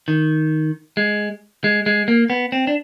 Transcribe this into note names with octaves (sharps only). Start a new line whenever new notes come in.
D#3
G#3
G#3
G#3
A#3
B3
C4
D4